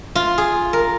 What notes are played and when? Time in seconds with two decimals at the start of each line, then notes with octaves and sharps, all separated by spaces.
0.15 F4
0.38 G#4
0.73 A#4